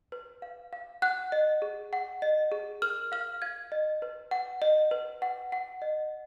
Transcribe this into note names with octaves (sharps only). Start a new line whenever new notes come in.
B4
F5
F5
F#5 F#6
D#5
G#4
F#5
D#5
G#4
A#4 F6
F5 F6
F5 G#6
D#5
B4
F#5
D#5
B4
F#5
F#5
D#5